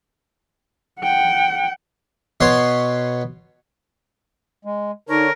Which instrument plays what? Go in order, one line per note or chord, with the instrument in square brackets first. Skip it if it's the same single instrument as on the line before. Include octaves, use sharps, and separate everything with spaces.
[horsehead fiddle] F#5 G5
[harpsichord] B2 B3 C#5 C6
[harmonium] G#3
[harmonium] D3 D4 C#5 [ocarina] D#4 [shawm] A#4